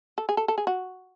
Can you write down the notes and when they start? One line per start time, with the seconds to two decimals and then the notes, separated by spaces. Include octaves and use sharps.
0.18 A4
0.29 G#4
0.37 A4
0.48 A4
0.58 G#4
0.67 F#4